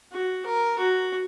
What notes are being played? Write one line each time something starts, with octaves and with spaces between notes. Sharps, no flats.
F#4
A#4
F#4